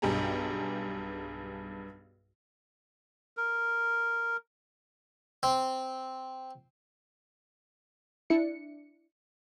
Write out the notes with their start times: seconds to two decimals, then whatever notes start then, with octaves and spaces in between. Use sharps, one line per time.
0.02 B1 G2 G4 G#4 A#5
3.37 A#4
5.43 C4
8.30 D4 E4 C#7